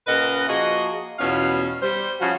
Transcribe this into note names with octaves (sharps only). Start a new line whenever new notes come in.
A#2 C#3 A#4 B4 D#5 F#5
F3 A#3 F#4 G#4 D#5
E2 B2 B3 C#4 F4 F5
G3 C5
C#3 F3 F4 F#4